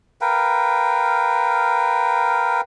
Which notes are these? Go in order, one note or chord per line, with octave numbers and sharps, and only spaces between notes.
A#4 B4 F5 G5